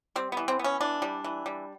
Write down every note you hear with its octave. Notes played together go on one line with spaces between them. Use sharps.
G3 C4
E3 B3
C4
B3
C#4
E3 D4
G3
E3
G3